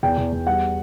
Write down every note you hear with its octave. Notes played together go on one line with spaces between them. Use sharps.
E2 G5
E2
E2
G3 F#5